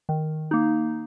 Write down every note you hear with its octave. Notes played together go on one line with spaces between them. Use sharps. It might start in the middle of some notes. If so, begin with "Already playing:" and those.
D#3
A#3 D#4